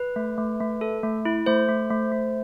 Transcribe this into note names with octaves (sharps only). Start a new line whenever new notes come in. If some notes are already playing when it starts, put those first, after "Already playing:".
Already playing: B4
A3
A3
A3
A4
A3
E4
A3 C5
A3
A3
A3